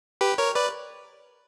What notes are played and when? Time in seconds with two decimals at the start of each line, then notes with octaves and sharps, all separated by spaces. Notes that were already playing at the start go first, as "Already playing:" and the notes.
0.21 G4 B4
0.38 A#4 C#5
0.55 B4 D5